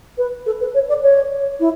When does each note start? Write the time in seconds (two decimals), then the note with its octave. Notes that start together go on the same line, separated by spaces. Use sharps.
0.18 B4
0.46 A4
0.61 B4
0.74 C#5
0.89 D5
1.03 C#5
1.60 E4